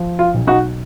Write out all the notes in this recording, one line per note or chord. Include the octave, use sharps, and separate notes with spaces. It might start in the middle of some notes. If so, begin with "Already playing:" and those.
Already playing: F3
F4
B1
D#4 F#4